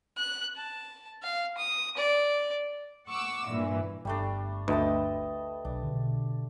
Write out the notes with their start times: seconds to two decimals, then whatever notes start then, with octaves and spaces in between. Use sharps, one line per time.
0.17 F#6
0.56 A5
1.23 F5
1.57 D#6
1.97 D5
3.07 F#5 C#6 D6 E6
3.51 G2 A#2 E3
4.05 G1 G3 A3 D4
4.68 D2 B4 D#5 E5 G5 A5 D#6
5.65 B1 D4
5.83 B2 D3